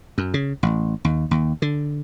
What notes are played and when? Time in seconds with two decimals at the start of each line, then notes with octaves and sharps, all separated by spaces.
0.18 F#2
0.34 C#3
0.63 A1
1.05 D#2
1.31 D#2
1.62 D3